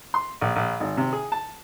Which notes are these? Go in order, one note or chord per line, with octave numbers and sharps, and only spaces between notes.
C6
A#1
A#1
G#1
C3
G#4
A5